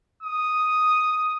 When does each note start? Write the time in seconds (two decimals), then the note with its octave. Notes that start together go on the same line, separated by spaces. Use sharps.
0.23 D#6